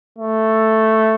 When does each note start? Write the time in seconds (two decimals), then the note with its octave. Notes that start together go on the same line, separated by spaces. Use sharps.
0.18 A3